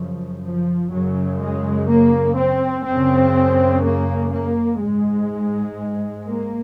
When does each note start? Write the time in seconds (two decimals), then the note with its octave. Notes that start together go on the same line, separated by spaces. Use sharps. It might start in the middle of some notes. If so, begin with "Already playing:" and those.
Already playing: F#2 C#3 F3
0.43 F3
0.91 F#2 C#3 F#3
1.40 G#3
1.88 A#3
2.37 C4
2.85 F#2 C#3 C4
3.83 A#3
4.31 A#3
4.80 G#2 G#3
6.26 A#3